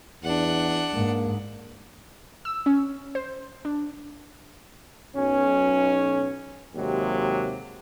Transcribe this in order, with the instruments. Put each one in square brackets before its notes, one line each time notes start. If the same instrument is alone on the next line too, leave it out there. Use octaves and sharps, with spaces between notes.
[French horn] E2 [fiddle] D4 F#5
[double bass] G#2 [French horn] A#3
[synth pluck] E6
C#4
C5
D4
[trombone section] B1 C#4
D#2 C3 F#3 G#3 G4